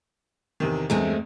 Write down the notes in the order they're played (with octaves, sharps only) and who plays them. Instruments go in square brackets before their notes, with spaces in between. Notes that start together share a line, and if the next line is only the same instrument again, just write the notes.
[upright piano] E2 C3 D#3
[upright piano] E2 G2 [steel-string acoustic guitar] G#3 A3 C4